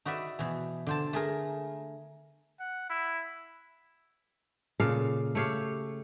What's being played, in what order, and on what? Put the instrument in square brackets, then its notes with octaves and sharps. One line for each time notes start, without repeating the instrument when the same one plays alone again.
[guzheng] D#4 F#4 B4 D5 E5
B2 E3
D3 C5 A5
A3 G#4 A#4
[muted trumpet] F#5
E4
[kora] A#2 C#3 A4 F5
A3 G4 C#5 F5